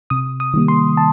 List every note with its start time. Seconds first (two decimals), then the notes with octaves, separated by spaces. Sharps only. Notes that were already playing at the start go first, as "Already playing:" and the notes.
0.10 C3 D#6
0.40 D#6
0.54 D#3 G3 A#3
0.68 C6
0.97 A5